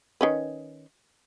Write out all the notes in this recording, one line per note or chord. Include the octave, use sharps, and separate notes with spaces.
D#3 C#4 B4